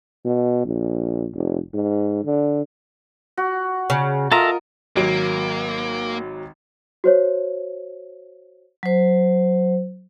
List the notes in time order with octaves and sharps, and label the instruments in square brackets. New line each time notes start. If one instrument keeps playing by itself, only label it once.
[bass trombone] B2
A#1
F1
G#2
D3
[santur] F#4
[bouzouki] C#3
[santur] F4 D#5 [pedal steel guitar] A4 E5 A#5 [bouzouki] A#4
[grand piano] G#1 F#3 D7 [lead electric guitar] A#3
[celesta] F#4 C5 C#5
[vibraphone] F#3 C5